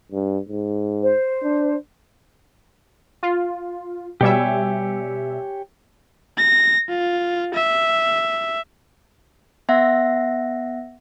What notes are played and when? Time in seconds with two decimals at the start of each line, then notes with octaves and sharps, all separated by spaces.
0.12 G2
0.49 G#2
1.02 C5
1.43 D4
3.23 F4
4.21 B2 G3 G4 C#5 E5 G#5
6.37 A#6
6.89 F4
7.54 E5
9.69 B3 E5 F#5 A#6